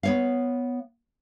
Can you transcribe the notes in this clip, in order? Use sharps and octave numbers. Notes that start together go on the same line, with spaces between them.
B3 C#5 F5